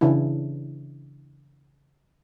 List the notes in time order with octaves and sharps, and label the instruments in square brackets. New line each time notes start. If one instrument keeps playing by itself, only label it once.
[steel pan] C#3 E3 D4 E4